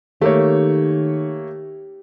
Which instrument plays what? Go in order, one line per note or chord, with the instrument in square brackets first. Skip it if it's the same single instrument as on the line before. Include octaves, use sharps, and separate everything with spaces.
[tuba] D#3 [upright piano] A3 A#3 C#5 [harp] G4